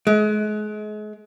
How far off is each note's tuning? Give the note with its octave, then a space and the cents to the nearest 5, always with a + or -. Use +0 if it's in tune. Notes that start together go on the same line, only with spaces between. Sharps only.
G#3 +35